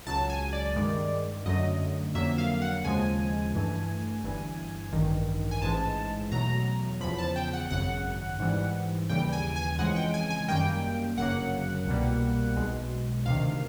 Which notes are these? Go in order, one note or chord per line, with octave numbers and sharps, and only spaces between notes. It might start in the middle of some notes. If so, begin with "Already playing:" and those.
C#2 C#3 F#3 A5
G#5
D5
G2 D#3 G#3
F#2 D3 F#3 A3 D#5
F2 D3 F#3 A#3 E5
F5
F#5
D#2 C#3 F3 G#3 G#5
G2 E3 A3
G1 G2 E3
A1 G2 D#3
G#5
A1 G#2 E3 G#3 A5
E2 B2 F#3 A3 A#5
E2 C#3 F3 B5
A5
G5
F#5
G#1 F#2 C#3 F#5
G#2 E3 G3
D#2 C#3 E3 G3 G5
G#5
G#5
F2 C#3 E3 G#3 F#5
G5
G#5
G#5
F#2 D#3 G3 A#3 G5
G1 F#2 C#3 F#3 A#3 F#5
C2 B2 G3 A#3
B1 B2 G#3
D2 C3 D#3 F5